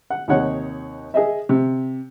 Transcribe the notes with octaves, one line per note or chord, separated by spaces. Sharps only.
F#5
D#2 C3 D#4 C#5 F#5
G#4 D#5 E5
C3